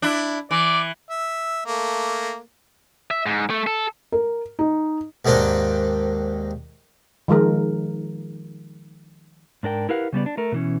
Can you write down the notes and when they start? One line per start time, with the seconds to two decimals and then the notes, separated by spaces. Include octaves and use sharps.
0.02 D4 E4
0.51 E3 D5
1.10 E5
1.66 A3 A#3
3.11 E5
3.26 G#2
3.50 A3
3.67 A4
4.12 A#4
4.59 D#4
5.25 D#2 G#2 A#3 C4 D4
7.28 D#3 F3 G#3 A#4
9.63 G#2 D4 A#4 G5
9.89 E4 G4 A#4 B4 F5 F#5
10.13 C#3 G3 B3 D5
10.26 D4
10.37 A3 A#4
10.52 B2 E3 C#4